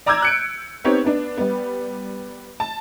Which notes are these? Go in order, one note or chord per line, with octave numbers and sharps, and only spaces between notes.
D5 A#5 D6 E6 G6 G#6
F#6 C#7 D7
B3 C4 D#4 G4 C#5
B3 D4
G3 B3
A5